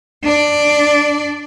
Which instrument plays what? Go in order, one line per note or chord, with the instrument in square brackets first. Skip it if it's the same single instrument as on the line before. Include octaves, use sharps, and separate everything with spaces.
[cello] D4 D5